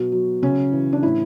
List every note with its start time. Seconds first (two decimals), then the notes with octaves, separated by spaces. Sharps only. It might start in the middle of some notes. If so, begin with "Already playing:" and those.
Already playing: B2 F#3
0.12 F#3
0.42 C#3 C#4
0.73 E3
0.93 D4
1.03 A2 E4